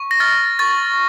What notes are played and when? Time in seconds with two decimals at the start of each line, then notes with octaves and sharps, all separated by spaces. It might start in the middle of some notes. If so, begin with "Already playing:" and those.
Already playing: C#6
0.11 A#6
0.20 F6 A6
0.59 C#6 A6